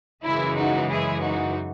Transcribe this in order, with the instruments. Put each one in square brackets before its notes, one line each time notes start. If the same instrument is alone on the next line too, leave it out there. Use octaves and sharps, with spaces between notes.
[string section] F#2 C#3 E3 G#3 E4
D#4 F#4
E4 G#4
D#4 F#4